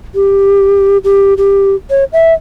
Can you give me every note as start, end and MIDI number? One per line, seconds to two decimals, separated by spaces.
0.15 0.97 67
1.04 1.34 67
1.37 1.75 67
1.90 2.04 73
2.13 2.33 76